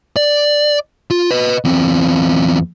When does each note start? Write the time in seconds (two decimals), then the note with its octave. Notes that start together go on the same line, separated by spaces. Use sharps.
0.16 D5
1.10 F4
1.31 B4 D#5
1.65 E2 C4